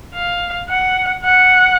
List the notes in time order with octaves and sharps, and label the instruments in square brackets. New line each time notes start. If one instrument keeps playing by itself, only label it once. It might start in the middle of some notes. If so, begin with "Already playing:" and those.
[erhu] F5
F#5
F#5